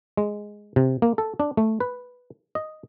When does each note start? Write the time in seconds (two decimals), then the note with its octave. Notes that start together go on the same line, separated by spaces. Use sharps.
0.17 G#3
0.76 C3
1.02 A#3
1.18 A4
1.40 D4
1.57 A3
1.80 B4
2.55 D#5